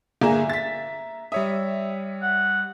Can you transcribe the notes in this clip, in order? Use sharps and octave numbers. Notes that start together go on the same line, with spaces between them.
G1 A#3 G#4 E5 A#5 E7
A6 B6
G3 C#5 E5 D#6
F#5